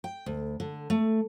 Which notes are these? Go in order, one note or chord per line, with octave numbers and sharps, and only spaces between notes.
G5
D2
D3
A3